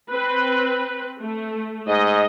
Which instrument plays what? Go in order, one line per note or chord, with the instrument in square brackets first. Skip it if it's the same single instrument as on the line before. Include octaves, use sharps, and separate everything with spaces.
[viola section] C4 B4
A3
[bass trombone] G#2 [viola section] D#5